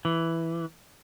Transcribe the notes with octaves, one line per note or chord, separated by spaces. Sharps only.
E3